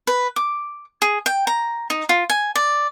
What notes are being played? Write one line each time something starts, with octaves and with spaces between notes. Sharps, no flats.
B4
D6
G#4
G5
A#5
D#4
F4
G#5
D5